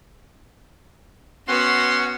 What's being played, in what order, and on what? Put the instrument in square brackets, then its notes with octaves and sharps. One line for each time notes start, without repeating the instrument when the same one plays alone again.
[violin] B3 F#4 [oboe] C#4 [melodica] F#5 [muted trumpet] C6